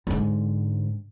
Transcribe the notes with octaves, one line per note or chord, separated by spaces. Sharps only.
G#2 D3